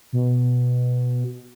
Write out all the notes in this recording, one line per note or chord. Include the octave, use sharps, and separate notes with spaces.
B2